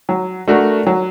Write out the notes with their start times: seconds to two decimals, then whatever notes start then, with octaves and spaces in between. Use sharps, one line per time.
0.09 F#3
0.48 A3 D4 F#4 A#4
0.87 F#3